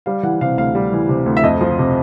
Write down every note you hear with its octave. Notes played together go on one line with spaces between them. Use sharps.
G3 F5
E3 F#5
C3 F5
D2 F5
G3
E3
C3
D2
E5
F2 D#5
F3
C3